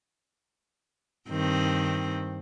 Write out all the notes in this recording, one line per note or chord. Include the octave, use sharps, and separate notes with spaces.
G2 D#3 C4